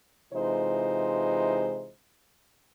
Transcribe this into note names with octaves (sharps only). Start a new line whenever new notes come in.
C3 E3 G#3 D#4 F4 C5